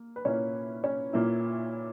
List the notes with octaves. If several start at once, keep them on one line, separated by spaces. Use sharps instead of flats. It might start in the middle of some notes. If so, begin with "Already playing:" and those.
Already playing: A#3
B4
A#2 A#3 C#4 E4 C#5
C#4 C#5
A#2 A#3 E4